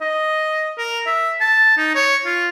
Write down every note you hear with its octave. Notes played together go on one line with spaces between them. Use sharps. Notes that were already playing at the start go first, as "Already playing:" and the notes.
D#5
A#4
E5
A5
D#4
C#5
F4